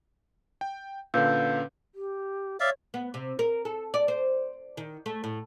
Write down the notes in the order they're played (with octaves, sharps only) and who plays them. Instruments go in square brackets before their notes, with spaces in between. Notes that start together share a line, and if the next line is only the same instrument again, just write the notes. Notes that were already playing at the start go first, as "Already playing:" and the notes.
[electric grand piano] G5
[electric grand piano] A#2 D3 [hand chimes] C#4 B4 [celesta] F5 E6 G6
[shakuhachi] G4
[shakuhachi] C#5 [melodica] D5 E5 F5
[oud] B3
C3
A#4
A4
D5
C5
D#3
A3
A2